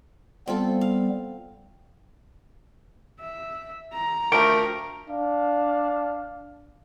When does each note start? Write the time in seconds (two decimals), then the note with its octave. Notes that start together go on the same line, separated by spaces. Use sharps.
0.48 G3 B3 C4 F4 A4
0.81 F5
3.20 E5
3.93 A#5
4.32 D2 F3 A3 G4 A#4 D7
5.08 D4 F5